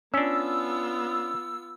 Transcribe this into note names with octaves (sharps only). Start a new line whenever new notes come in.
B3 C#4 D4 F4 E6